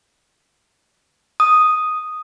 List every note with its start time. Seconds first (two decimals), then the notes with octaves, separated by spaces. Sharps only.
1.40 D#6